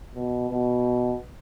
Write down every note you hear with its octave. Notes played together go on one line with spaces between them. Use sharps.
B2
B2